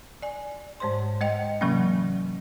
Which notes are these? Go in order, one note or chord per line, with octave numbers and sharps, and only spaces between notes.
D5 G#5
G#2 G#3 C5 C#5 C6
G#3 D#5 G5
C3 E3 F#3 G#3 A#3 C#4